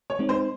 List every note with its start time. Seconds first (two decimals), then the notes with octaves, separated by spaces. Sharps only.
0.10 C#5
0.19 G#3 C4 D#4
0.29 C5